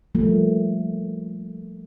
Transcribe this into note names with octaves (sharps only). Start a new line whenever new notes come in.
F3 G3 A3 A#3